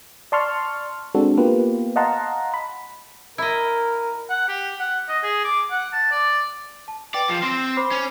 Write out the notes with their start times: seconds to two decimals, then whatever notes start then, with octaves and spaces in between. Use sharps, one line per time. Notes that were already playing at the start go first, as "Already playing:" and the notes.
0.32 D5 A5 C6 C#6 F6
1.15 G#3 C4 D4 F#4 A4
1.37 A#3 B3 F4 G4 B4
1.96 D#5 F5 F#5 A5 A#5 C6
2.54 B5
3.38 E4 A#4 D#5
4.30 F#5
4.49 G4
4.80 F#5
5.09 D#5
5.23 G#4
5.45 D6
5.71 F#5
5.93 A5
6.11 D5
6.88 A5
7.14 B4 D5 G5 F#7
7.29 F3 A5
7.43 C4 C6 A#6
7.77 C5 B5 D6
7.91 C#4